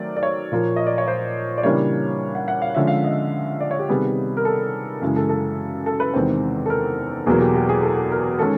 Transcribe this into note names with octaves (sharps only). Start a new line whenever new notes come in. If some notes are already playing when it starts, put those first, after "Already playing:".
Already playing: D#3 F#3 A3 C4 A#4 D5
D5
C#5
A#2 F3 A#3
D#5
D5
C#5
C5
D5
C#3 E3 G3 A#3 D4 C#5
F#5
F#5
F5
D3 F3 G#3 C#4 E5
F5
D#5
D5
C#5
G4
C3 D#3 G3 B3 G#4
A#4
A4
F#2 C#3 E3 G#3
A4
A4
A4
B4
E2 C3 D#3 G#3 C4
A4
A#4
E2 B2 F#3 A#3 G#4
G4
G4
G#4
A4
A4
A#4
D#3 G#3 C#4 A4